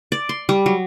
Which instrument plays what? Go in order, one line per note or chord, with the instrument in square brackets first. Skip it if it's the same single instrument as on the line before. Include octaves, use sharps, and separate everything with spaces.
[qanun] D5
C6
G3
F#3